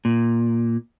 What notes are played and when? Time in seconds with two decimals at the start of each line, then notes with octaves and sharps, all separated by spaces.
0.05 A#2